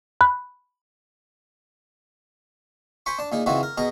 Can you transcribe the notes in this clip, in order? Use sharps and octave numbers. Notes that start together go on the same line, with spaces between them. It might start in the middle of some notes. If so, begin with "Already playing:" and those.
B5 F#6
C5 G#5 B5 C#6
D4 A5
A#2 D#4 G#4
C#3 E3 C4 D#4 F#4
A#4
B2 G#4 D#5 A#5